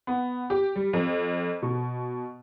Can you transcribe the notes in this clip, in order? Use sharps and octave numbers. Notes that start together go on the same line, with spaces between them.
B3
G4
G3
F2
B2